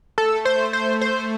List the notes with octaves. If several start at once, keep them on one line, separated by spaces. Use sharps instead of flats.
A3 A4
C5
C5
C5